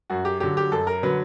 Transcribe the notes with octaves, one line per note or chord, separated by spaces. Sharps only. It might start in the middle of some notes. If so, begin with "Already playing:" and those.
F#2 F#4
G4
D3 F#3 G4
G4
F#2 A4
A#4
D3 F#3 B4